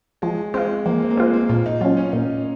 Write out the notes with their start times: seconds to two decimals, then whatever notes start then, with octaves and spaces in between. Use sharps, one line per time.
0.22 F3 G#3
0.54 G#3 C4 F4
0.86 F3 A#3
1.02 C4
1.10 A#3
1.17 G#3 C4 F4
1.34 A#3
1.49 A#2 F4
1.66 D#4
1.81 F#3 C#4 F4
1.97 C#4
2.13 A#2